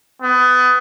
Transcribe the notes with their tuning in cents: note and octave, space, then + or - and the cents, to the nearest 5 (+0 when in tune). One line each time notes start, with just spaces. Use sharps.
B3 +25